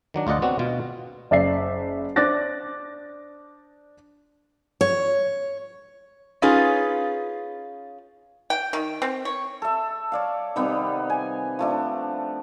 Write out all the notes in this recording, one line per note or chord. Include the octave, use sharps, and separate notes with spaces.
D#3 F#3 D4
D2 F4 D5 D#5 F#5
B3 C4 D4 F#4
B2 F4
F#1 D5 E5 C7
D4 C5 D6 F#6 A6 A#6
C#5
C#4 D#4 F4 G#4 B4
G5
D#3
C4
C#5
A4 E5
C#5 D5 F5
C3 D#3 G3 B3
G#5
F3 A3 D4